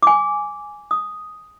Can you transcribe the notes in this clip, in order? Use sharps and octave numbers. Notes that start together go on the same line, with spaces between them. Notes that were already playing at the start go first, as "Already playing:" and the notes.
G#5 D6
D#6